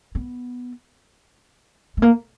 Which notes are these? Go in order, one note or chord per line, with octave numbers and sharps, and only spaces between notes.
B3
A3
A#3